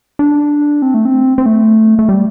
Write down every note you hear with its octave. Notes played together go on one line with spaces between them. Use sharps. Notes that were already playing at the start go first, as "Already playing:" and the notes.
D4
C4
A3
C4
C4
A3
A3
G3